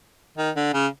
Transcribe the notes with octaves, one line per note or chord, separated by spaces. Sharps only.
D#3
D3
C#3